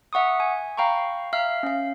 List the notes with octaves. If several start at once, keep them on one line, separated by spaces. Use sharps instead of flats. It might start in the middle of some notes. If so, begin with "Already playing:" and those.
E5 F#5 C#6 D#6
G#5
F5 G5 A#5 B5 C#6
E5 F5 F6
C#4 F5